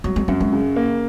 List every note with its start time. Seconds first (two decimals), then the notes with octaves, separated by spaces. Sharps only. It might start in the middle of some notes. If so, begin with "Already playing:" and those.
0.04 F#3 G3
0.16 G#3
0.28 F#2 G3
0.41 G#3
0.53 C#3
0.76 A#3